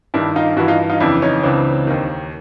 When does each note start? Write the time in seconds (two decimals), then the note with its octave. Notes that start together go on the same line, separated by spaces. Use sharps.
0.14 G2 D#3 D4 E4
0.36 D#4 F4
0.57 G2 E3 E4 F#4
0.68 D#4 F4
0.90 D#4 F4
1.00 F2 C#3 E3 D4 E4
1.22 C#4 D#4
1.43 C#2 C#3 E3 C4 D4
1.87 D#2 D#3